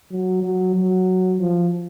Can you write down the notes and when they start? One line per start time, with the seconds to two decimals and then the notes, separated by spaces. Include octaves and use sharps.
0.11 F#3
0.43 F#3
0.75 F#3
1.39 F3